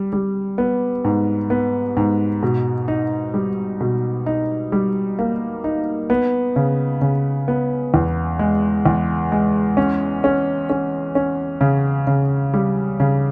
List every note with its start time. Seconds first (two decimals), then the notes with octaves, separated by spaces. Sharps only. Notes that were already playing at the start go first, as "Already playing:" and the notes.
Already playing: G3
0.13 G3
0.58 B3
1.05 G#2
1.50 B3
1.97 G#2
2.43 B2
2.88 D#4
3.34 G3
3.80 B2
4.26 D#4
4.72 G3
5.19 A#3
5.64 D#4
6.10 B3
6.56 C#3
7.02 C#3
7.48 B3
7.94 E2
8.39 G#3
8.86 E2
9.32 G#3
9.77 C#4
10.24 C#4
10.70 C#4
11.15 C#4
11.61 C#3
12.07 C#3
12.54 G3
13.00 C#3